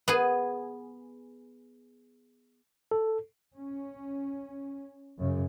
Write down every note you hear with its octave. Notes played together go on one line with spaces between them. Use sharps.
B3 G#4
A4
C#4
F#2 C#3